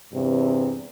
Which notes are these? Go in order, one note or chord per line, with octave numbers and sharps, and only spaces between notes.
E2 G2 C3